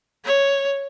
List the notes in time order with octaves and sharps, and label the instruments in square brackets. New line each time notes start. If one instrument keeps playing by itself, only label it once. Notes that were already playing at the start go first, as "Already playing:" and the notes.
[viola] C#5